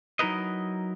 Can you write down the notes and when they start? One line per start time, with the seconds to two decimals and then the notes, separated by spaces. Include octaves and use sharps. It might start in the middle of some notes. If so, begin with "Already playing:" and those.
0.19 F#3 D#4 E4 A#4 B4 D#5